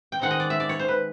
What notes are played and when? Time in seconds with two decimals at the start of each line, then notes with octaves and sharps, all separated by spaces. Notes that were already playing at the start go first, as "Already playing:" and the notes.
0.12 G5
0.19 D#3 G#3 C4 D#4 F#5
0.31 D#5
0.40 D5
0.50 E5
0.60 D5
0.69 C#5
0.79 C5
0.88 B4